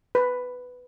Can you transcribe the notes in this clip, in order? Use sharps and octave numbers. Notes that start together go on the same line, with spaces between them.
B4